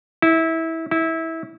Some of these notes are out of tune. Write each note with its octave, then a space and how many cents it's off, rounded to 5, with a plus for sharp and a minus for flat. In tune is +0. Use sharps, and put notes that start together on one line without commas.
E4 -20
E4 -20